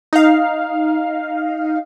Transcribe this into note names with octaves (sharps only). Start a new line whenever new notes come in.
D#4 F5